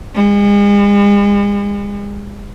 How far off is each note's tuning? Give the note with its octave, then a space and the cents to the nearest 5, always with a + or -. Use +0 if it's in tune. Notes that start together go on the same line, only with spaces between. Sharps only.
G#3 -40